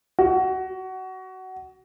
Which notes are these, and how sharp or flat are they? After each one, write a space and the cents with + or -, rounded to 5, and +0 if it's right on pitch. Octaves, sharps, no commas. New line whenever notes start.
F#4 +20